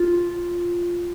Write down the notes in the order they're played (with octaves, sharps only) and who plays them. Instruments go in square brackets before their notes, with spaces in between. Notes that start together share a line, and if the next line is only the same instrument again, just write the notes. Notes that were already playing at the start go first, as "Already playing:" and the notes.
Already playing: [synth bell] F4